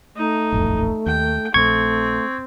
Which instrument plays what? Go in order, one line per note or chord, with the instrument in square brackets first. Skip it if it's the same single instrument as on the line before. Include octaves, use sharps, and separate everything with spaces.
[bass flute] A3 [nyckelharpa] D#4
[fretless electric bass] D#1 A1 F2
[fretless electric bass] D#2 [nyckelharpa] G5
[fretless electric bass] A#1 [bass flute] A3 [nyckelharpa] C4 [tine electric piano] C#6 G#6